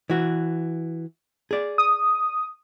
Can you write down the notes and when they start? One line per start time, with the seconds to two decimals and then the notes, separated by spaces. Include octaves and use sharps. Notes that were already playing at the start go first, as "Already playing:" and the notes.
0.10 E3 F#4
1.51 G#4 D5
1.78 D#6